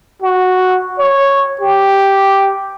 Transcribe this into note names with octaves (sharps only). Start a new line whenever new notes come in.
F#4
C#5
G4